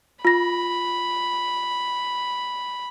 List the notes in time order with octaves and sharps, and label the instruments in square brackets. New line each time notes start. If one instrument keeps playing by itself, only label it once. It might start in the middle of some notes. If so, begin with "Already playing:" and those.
[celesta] F4 A#6 [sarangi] B5